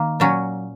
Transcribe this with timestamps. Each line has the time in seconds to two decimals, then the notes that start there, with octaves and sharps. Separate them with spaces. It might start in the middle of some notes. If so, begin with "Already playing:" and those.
Already playing: D#3 A#3
0.20 A#2 F#3 C#4